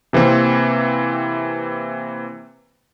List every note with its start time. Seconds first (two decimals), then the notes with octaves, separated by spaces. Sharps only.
0.13 C3 E3 A#3 C4